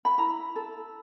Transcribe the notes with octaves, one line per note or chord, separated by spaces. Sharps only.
B5
E4 A#5
A4